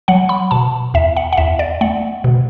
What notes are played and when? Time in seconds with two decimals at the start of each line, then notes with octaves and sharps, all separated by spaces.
0.08 F#3 F#5
0.29 B5
0.51 B2 A5
0.94 E2 E5
1.17 F#5
1.33 F#5
1.37 E2 E5
1.59 D5
1.81 A3 F#5
2.24 B2